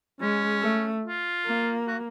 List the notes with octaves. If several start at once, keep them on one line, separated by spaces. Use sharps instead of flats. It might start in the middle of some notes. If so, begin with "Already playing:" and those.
G#3 C#4
A3
F4
A#3
F#4